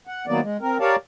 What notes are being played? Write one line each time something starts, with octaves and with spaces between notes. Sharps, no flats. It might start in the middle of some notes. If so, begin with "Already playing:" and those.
F#5
D#3 F#3 A#3 B3 D5
G#3
C4 A#4
G4 A#4 C#5 D5 F5 A5